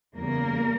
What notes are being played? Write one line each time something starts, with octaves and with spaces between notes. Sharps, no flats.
E2 C#3 G3 A#3 A#4